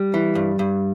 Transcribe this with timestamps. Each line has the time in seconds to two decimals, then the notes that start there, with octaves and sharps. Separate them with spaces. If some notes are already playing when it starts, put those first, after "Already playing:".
Already playing: G3
0.14 E3
0.35 G2
0.59 G2